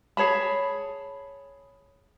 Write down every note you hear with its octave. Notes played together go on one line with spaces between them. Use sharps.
G#4 C#5 A5 B5